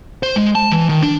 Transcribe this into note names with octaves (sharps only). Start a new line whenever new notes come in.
C5
G#3
A5
E3
D#3
D4